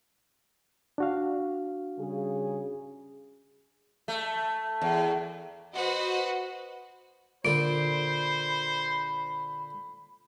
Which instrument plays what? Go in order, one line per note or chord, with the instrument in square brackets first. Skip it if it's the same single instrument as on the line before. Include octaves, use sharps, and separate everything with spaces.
[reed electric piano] D4 F#4 F5
[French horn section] C#3 G3 G#4
[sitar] A3
E2
[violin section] F#4 B4 C5 D#5 F#5
[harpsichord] A#2 D3 [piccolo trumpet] C5 [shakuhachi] B5 [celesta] D7